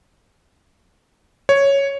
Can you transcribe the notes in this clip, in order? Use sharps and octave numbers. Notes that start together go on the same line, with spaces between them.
C#5